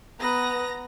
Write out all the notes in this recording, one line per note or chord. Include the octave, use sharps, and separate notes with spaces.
B3 B4 A#5 D#6 A#6